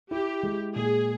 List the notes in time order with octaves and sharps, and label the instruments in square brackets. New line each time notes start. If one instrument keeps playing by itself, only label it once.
[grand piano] E4 [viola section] G4
[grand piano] G#3
[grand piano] A#2 [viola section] G#4